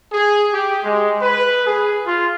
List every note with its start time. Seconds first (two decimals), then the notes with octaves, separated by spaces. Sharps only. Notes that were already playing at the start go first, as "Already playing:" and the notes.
0.12 G#4
0.52 G4
0.83 G#3
1.21 B4
1.65 G#4
2.06 F4